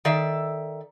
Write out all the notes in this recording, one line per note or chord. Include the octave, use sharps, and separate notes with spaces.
D#3 A4 D5 E5